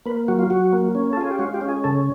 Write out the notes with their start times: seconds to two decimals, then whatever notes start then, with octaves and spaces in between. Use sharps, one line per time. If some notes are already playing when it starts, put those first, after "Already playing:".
0.06 A#3 B4
0.28 F#3 F#4
0.39 F4
0.50 F#3 F#4
0.73 A#3
0.95 C#4
1.13 A4
1.17 F4 G#4
1.31 G4
1.39 G#3 F#4
1.54 G4
1.61 C#4
1.69 G#4
1.84 C#3 A4